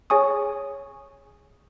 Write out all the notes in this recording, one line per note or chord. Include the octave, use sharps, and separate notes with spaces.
G#4 C#5 G#5 C#6 D#6